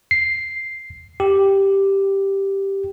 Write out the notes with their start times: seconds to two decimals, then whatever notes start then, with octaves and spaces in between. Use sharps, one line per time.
0.11 C7
1.20 G4